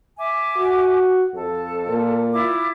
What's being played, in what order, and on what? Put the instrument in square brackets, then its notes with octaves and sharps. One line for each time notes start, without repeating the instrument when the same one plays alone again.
[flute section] E5 G#5 D6
[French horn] F#4
[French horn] F2 [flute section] A4
[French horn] A#2
[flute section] E4 F4 D6